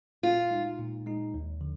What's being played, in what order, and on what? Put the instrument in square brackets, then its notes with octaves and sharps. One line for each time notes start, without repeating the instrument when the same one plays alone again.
[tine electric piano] A#2 [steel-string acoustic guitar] F4
[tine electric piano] G#3 D#4
A#2
G#3 D#4
D#2
D3 F3